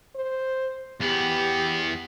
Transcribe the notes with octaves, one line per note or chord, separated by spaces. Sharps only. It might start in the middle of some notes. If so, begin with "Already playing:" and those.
C5
E2 B3 G4